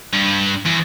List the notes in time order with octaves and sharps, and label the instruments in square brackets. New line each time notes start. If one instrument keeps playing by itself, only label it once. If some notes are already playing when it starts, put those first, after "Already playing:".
[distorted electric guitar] G2
E2